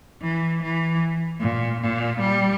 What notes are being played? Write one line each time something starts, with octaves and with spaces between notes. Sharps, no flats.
E3
E3
A#2
A#2
G3